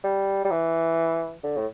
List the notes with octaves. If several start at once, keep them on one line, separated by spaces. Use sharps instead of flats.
G3
G3
E3
D3
A2